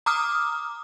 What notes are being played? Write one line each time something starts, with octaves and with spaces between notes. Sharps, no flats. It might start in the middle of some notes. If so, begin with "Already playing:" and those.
A#5 D6 D#6 F6